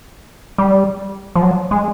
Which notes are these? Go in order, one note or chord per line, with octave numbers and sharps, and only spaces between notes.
G3
F3
F#3
G#3